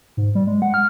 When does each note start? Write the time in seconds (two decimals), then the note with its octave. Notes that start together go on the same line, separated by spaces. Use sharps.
0.17 G#2
0.35 G3
0.47 G#3
0.62 F#5
0.74 F6